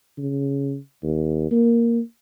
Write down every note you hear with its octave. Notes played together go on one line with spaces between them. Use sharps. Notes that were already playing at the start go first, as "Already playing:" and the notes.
C#3
D#2
A#3